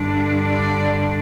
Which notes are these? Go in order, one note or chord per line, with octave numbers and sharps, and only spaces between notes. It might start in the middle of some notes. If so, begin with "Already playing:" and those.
Already playing: G2 D3 G3 D4
D5